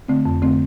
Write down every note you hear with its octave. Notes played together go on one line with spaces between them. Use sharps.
D3 A3 C4
F2
D3 A3 C4